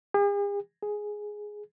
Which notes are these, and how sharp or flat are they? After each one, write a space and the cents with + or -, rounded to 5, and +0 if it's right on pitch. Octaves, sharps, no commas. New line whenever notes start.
G#4 -45
G#4 +5